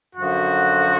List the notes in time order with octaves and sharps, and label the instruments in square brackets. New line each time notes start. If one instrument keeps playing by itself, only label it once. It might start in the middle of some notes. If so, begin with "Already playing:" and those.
[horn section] F#2 D3 F3 F#4